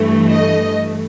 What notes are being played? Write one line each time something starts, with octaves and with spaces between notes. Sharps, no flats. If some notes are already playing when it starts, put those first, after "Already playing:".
Already playing: G2 E3 A3
D#5